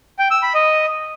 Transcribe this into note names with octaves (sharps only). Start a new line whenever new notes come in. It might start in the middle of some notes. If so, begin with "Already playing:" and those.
G5
E6
B5
D#5